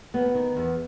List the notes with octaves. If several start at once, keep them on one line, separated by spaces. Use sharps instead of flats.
D#2 B3
D#3
E2